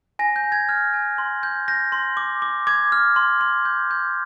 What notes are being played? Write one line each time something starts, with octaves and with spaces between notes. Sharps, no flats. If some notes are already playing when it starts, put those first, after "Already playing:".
G#5 A#6
G6
G#5
G#6
F6 G#6
G#5
C6
G6
G6 A#6
C6
D6
D6
D6 G#6
F6
C6
C6
G6
G6